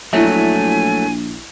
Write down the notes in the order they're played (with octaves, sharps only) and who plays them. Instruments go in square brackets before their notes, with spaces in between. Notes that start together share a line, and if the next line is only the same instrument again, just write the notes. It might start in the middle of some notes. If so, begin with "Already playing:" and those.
[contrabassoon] A#1 [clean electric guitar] F#3 A3 [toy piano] E4 E5 [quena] G#5